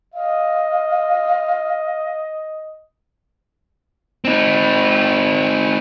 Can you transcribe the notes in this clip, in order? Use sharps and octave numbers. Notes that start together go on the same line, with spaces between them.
D#5 F5
C4 D#4